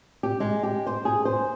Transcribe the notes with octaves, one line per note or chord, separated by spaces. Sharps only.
G4
G#3
G4
C5
G#4
C5